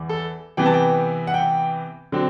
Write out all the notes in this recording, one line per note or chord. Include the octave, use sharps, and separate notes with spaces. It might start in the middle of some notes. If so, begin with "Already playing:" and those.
Already playing: E2 E3
A4
C3 E3 B3 G5
A5
G5
F#5
G5
D3 F#3 C4